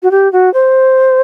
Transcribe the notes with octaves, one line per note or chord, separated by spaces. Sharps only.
F#4
G4
F#4
C5